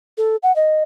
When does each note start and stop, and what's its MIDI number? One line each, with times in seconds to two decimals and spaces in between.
0.18 0.36 69
0.43 0.54 78
0.56 0.83 75